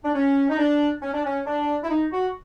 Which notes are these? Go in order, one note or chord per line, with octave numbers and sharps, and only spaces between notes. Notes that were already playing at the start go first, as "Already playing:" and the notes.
D4
C#4
D#4
D4
C#4
D4
C#4
D4
E4
D#4
F#4